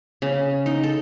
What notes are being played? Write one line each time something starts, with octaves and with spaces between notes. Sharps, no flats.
C#3
D#4
A4